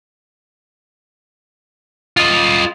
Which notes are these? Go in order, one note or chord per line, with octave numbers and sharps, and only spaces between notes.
F4 D#5